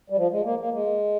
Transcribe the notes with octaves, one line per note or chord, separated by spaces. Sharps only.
G3
F3
G#3
A#3
A#3
G#3